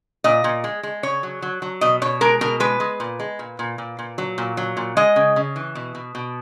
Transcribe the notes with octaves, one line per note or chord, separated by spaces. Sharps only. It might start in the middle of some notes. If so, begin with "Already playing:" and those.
A#2 D#5
A#2
G#3
G#3
C#3 C#5
F#3
F#3
F#3
B2 D#5
B2 C#5
G#3 A#4
B2 A#4
G#3 B4
G#3
A#2
G#3
A#2
A#2
A#2
A#2
F#3
A#2
F#3
A#2
G#3 D#5
C#3
C#3
E3
B2
B2
B2